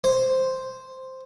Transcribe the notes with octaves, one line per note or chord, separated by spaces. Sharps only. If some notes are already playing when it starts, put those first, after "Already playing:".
C5